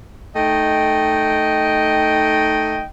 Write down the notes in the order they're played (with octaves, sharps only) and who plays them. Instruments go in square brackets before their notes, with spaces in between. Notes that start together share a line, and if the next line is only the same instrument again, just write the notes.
[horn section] A3 D#4 D#5 G5